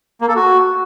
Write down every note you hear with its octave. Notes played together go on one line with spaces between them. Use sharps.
A#3
A4
F#4